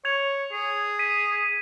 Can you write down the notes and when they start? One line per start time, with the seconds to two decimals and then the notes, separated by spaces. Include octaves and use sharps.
0.05 C#5 G#6 F7
0.53 G#4
0.99 B6 D#7